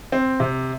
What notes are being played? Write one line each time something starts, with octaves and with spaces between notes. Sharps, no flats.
C4
C3